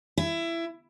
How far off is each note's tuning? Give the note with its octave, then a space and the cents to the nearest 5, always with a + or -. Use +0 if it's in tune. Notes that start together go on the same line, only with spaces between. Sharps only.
E4 +20